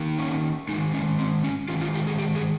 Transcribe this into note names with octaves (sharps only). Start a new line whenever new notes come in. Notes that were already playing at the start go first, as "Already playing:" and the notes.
Already playing: D#3 A#3
C#4
D#3 G#3 D#4
C#4
C4
C#4
D#3 G#3 F4
F4
G4
G#4
G4
G#4